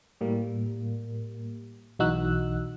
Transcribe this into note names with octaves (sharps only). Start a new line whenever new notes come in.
A2 G3 A#3
B1 E3 D#4 F#4 E6 F#6